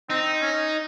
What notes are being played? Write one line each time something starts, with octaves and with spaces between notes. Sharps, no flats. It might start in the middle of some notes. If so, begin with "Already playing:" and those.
C4 D#4
C#4